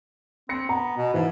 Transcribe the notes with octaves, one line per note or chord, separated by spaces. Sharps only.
C4 A#6 C#7
B3 A#5
B2
G#2 E3